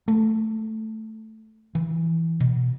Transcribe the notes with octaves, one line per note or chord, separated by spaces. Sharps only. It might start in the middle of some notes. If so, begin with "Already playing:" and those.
A3
E3
B2